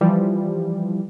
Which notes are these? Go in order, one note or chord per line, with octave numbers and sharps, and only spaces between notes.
E3 F3 G3